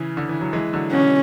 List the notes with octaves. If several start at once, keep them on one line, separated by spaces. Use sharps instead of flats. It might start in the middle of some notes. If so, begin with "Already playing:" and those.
Already playing: C#3 E3
D3
E3
F#3
E3 G#3
D3 F#3
B2 D3 C#4